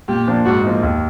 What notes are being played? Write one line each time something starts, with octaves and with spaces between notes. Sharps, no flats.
A#2 G4
F3 A#3 D4
G#2 F#4
F3 A#3 D#4
D#2